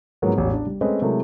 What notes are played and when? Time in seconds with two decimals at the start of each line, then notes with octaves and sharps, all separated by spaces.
0.22 G#2 F3 F#3 G#3 A#3 B3
0.37 E1 A1
0.52 D4
0.67 G3
0.81 G#3 A3 C4 C#4 B4 D#5
1.02 C3 F#3 G#3 A3 E4 A#4